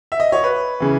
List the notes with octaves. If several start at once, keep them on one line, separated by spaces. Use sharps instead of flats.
E5
D#5
C#5
B4
C#3 E3